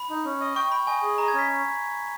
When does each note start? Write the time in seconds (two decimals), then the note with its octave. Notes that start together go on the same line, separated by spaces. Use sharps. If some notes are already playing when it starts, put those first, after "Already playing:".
Already playing: B5
0.10 D#4
0.25 C#4
0.40 D#5
0.56 G5 C#6
0.71 G5 B5
0.87 D#5 G#5
1.03 G#4
1.18 D#5 A#5
1.28 G#6
1.34 C#4 B6